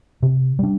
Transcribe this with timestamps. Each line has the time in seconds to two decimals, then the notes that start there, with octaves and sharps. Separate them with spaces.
0.23 C3
0.59 G3 D4